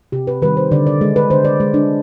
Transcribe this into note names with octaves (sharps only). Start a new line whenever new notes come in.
C3 G4
B4
D#3 G3 B4
C5
D3 D5
D5
G#3
B4
D3 C5
D5
G#3
D4